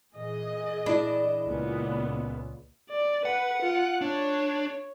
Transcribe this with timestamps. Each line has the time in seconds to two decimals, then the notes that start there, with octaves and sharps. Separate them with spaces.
0.13 A#2 E3 G#4 D#5
0.86 D4 E4 D5 B5
1.46 C#2 A#2 A#3 B3 F4
2.90 D5
3.25 B4 F#5
3.62 F4
4.01 D4 C#5